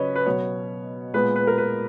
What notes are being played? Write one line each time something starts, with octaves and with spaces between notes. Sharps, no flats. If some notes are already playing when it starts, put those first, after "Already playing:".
Already playing: C#3 F#3 C#4 B4 C#5 D#5
B4
B2 F#3 B3 C#5
A#2 G#3 B3 B4
B4
A#4
B4